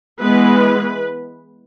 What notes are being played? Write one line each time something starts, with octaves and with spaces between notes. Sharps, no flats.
E3 G#3 B3 B4